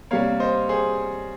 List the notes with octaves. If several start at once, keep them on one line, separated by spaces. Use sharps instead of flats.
C3 G3 A#3 C#5 F5
C5 D#5
G#4 C5